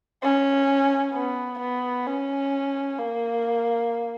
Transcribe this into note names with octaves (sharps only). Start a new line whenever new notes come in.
C#4
B3
B3
C#4
A#3